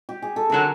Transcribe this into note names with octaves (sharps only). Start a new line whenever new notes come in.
G4
G#4
A4
D3 F#3 A#4